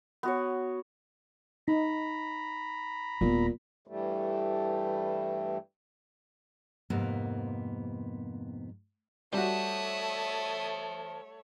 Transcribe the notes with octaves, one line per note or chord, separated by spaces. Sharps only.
B3 F#4 C#5
D#4 A#5 B5
D#1 A#2 B3
G2 E3 G3 A3
F2 G#2 C3 A#3 B3
G3 A3 F#4 C5 C#5 E5 A5 D#6